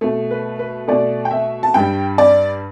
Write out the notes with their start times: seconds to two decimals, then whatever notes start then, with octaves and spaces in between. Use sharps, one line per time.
0.01 B2 A3
0.31 B4
0.59 B4
0.88 B2 A3 D5
1.25 G5
1.31 E5
1.63 A5
1.74 G2 G3 G5
2.18 D5